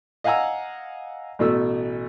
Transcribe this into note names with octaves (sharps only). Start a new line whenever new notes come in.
D#5 F5 F#5 G#5 A#5 E6
A1 B2 A3 E6